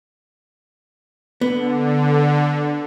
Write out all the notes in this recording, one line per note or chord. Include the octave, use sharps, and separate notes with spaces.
D3 B3